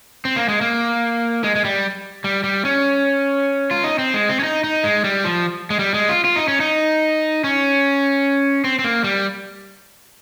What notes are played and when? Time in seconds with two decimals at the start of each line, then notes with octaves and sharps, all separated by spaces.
0.25 C4
0.36 A#3
0.49 G#3
0.61 A#3
1.44 G#3
1.55 G#3
1.65 G3
2.24 G3
2.44 G3
2.65 C#4
3.71 F4
3.84 D#4
3.99 C4
4.14 G#3
4.29 C4
4.39 C#4
4.44 D#4
4.64 D#4
4.84 G#3
5.04 G3
5.24 F3
5.70 G#3
5.79 G3
5.94 G#3
6.09 F4
6.25 F4
6.36 D#4
6.48 C#4
6.60 D#4
7.44 C#4
8.64 C4
8.79 C4
8.84 A#3
9.04 G3